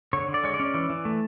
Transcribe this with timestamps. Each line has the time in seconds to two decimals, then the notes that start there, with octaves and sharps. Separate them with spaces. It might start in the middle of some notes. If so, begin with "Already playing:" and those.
0.13 D3 C#5
0.28 D3
0.34 D5
0.44 G#3 C#5
0.54 D5
0.60 C#4
0.74 E3
0.90 E3
1.05 A3